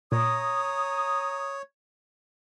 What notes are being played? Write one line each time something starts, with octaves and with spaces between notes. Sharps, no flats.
A#2 C#5 A#5 D#6